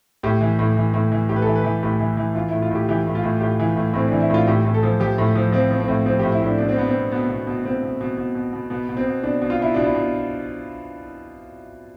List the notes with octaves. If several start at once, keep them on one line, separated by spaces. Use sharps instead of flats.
A2 G4
E3
A2
E3
A2
E3
A2 G4
B4
A4
E3
B4
E3
A2 G4
E3
E3
E3 F4
E4
A2
F4
A2 G4
E3 G4
A2
F4
A2
A2 G4
E3
A2
A2 C4
E3 D4
E4
A2 F4
A2 G4
A2
A4
F3
F3 G4
A2
F3
F3 C4
F3
C4
A2
F3 C4
G4
A2
E4
A2 D4
B2 D4
C4
B2 B3
C4
B2
B2 B3
B2
B2
B2 C4
B2
B2
B2
B2
B2
B2 B3
B2
C4
B2
B2 D4
B2
F4
B2 E4
B2 D4
E4
B2